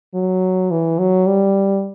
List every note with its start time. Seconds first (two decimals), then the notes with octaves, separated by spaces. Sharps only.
0.14 F#3
0.71 E3
0.99 F#3
1.27 G3